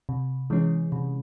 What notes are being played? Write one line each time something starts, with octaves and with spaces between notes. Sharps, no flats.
C3
E3 G#3 C#4
C3